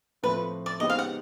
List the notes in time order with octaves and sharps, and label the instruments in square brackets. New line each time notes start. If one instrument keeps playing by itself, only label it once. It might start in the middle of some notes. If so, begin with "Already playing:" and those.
[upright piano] A2 F3 A3 C4 [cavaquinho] B4
[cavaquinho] D5
[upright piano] G#3 B3 D#4 G4 C5 [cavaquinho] D#5
[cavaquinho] F5
F#5